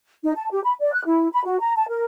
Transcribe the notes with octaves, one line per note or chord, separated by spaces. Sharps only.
D#4
A5
G4
B5
D5
F#6
E4
B5
F#4
A#5
A5
A#4